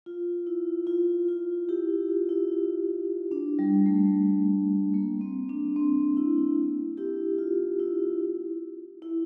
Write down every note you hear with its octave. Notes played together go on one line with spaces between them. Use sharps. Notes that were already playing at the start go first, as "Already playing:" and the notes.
F4
E4
F4
F4
E4 G4
F4
F4
E4
D4
G3
A3
A#3
C4
D4
C4
E4
E4 G4
F4
E4
E4